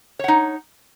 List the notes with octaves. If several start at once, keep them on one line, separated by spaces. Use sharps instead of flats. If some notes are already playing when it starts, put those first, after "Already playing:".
D#4 C#5 F#5